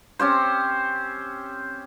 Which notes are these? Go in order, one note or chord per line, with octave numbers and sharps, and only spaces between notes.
C4 C#4 G4 C5